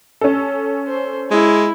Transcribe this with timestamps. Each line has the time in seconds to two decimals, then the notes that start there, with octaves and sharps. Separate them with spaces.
0.21 C#4 A4
0.87 C5
1.31 G#3 E4